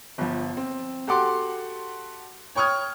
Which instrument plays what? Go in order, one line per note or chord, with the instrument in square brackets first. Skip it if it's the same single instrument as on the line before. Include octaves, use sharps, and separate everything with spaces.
[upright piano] G1 F3
C4
F#4 G4 A4 F#5 C6 D6
C#5 G5 C#6 D#6 F6 G#6